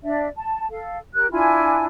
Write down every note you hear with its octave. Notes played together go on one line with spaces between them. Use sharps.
D4 D5 E5
A5
A4 F5
G4 A#4 F#6
D4 E4 F4 G#5